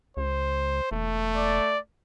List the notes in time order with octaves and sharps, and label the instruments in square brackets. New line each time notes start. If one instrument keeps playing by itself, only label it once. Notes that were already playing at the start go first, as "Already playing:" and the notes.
[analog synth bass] C#2 [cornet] C5
[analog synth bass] E1 [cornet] A3
[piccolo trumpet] D5